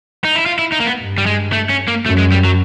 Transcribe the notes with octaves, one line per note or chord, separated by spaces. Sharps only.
D#4
E4
F4
E4
D#4
A#3
B3
G2
G3
G#3
A3
C#4
A#3
F#2 A3
G#3
G3
F#3